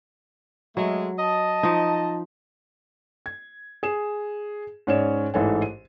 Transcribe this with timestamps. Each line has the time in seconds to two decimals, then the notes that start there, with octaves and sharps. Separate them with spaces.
0.77 F#3 G#3 A3 E5
1.19 D#5 A5
1.63 F3 D#4
3.26 G#6
3.83 G#4 E7
4.87 G#2 C#4 C#5 D5 E7
5.34 A1 G#2 E3 A4 C#5 G#5
5.62 D#7